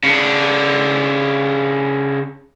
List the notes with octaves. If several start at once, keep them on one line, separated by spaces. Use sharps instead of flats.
C#3 D4